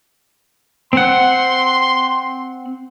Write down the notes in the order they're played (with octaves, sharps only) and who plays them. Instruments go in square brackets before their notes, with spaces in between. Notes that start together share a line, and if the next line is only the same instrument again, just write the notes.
[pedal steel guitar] C4 F#5 [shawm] C6